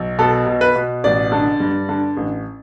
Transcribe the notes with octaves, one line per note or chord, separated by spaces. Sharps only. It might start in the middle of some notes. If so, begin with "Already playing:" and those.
Already playing: B1
B2 A4
B2
B4
B2
A1 D5
D3
G2
D3
A1